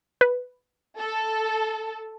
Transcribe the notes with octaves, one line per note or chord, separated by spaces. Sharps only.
B4
A4